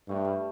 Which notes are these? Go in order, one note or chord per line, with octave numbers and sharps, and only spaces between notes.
G2 A3
G3